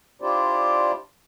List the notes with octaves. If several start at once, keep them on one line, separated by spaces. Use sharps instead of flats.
D4 E4 F4 G4 C5 D5